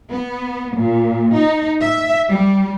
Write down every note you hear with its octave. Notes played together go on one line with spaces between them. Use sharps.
B3
A#2
D#4
E5
G3